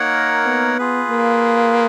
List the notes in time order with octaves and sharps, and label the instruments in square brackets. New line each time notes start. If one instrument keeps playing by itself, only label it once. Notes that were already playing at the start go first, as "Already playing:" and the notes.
Already playing: [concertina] A#3 D#4 A#4 C#5 F#5
[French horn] B3
[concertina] F4 G#4 B4
[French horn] A#3